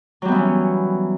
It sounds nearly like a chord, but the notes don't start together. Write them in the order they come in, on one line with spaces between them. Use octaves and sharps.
F#3 G3 B3 E3 C#4